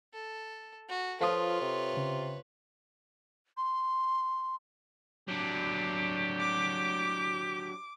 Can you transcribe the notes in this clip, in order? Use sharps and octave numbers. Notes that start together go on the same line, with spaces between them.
A4
F#4
F3 F4 A4 B4 C#5 F5 D#6
C3
C#3
C6
F#3 D4 G4
D6